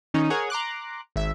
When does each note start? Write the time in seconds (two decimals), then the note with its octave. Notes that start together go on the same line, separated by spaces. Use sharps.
0.14 D#3 C#4 D#4
0.30 G#4 A#4 C#5 F#5 G#6
0.50 A#5 C6 D6 F#6
1.16 G#1 E5